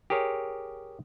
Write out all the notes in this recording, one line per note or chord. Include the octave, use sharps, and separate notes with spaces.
G4 G#4 A#4 C#5